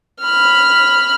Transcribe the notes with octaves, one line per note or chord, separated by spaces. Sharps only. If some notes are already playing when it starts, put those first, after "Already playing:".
B5 F6